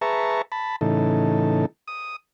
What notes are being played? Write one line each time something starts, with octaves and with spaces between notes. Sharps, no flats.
G#4 B4 E5 A5 A#5 C#6
A5 B5
A2 C#3 E3 D#4 A4
D#6